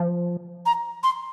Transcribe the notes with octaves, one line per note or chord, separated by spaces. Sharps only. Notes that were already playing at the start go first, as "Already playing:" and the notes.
Already playing: F3
A#5
C6